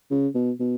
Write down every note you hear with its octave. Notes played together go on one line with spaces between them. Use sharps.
C#3
B2
B2